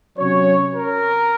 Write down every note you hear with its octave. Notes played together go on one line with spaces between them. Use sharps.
C3 F#3 C#4 C#5
A#4